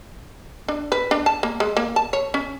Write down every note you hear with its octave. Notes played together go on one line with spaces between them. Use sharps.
D4
B4
D4
A5
A#3
G#3
A#3
A5
C#5
C#4